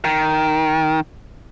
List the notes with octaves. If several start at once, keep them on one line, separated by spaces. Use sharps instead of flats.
D#3